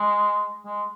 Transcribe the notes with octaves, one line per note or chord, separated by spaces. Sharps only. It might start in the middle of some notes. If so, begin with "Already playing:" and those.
Already playing: G#3
G#3